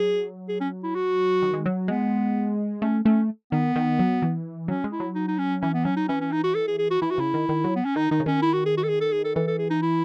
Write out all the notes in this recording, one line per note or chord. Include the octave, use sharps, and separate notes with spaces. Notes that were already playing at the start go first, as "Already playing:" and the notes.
Already playing: F#3 G#4
G#4
C#4
E4
F#4
D#3
G#3
F#3
G#3 B3
A3 C#4
A3 C#4
D#3 B3
D#3
F#3
E3
F#3 C#4
G#3
E4
F#3
D#4
D#4
C#4
E3 C#4
B3
F#3 C#4
D#4
E3 C#4
C#4
D#4
F#4
A4
G#4
G#4
F#4
E3 E4
F#4
C#3 E4
D#3
D#3
F#3
B3
C#4
D#3 D#4
D#3 D#4
C#3
D#3 C#4
E4
F#4
G#4
F#4
A4
G#4
A4
G#4
A4
E3 A4
A4
G#4
D#4
E4